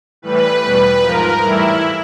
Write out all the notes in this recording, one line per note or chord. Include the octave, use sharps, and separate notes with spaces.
A2 E3 G3 B4
E2 B2 G3
G#2 F3 A#4
A2 E3 G3 E4